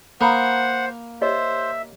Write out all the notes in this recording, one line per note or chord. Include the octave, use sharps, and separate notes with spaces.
A#3 C5 F#5 A#5 B5 D#6
G4 C5 C#5 D#5 E5